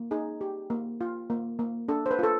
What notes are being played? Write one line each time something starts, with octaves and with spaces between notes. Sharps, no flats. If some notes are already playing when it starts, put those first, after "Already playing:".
Already playing: A#3
D#4 G#4
G4
A#3
F4
A#3
A#3
D4 A4
C5
B4
F4 A4